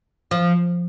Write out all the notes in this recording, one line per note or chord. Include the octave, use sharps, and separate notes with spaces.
F3